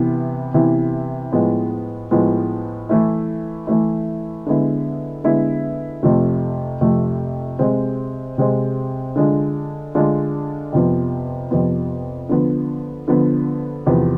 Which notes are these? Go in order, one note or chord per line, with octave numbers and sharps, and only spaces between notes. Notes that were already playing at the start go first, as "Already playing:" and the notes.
Already playing: C3 E3 B3 E4
C3 E3 B3 E4
A2 F3 G#3 B3
A2 F3 G#3 B3
E3 A3 E4
E3 A3 E4
D3 G#3 B3 E4
D3 G#3 B3 E4
F2 C3 F3 A3
F2 C3 F3 A3
C3 G#3 C4
C3 G#3 C4
D3 G#3 D4 F4
D3 G#3 D4 F4
F2 C3 F3 B3
F2 C3 F3 B3
D3 F3 B3
D3 F3 B3
E2 C3 F3 B3